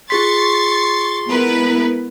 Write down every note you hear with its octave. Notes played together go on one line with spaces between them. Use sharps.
F4 G#4 C6 C#6 A6 B6
G#3 B3 E4 A#4 B4